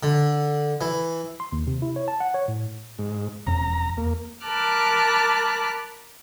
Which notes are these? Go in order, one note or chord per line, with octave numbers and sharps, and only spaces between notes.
D3
E3
C6
D#2
C3
E4
C#5
A5
F#5
C#5
A2
G#2
E1 F2 C#4 A#5
E2 A#3
A#4 A5 B5 D6 F6 F#6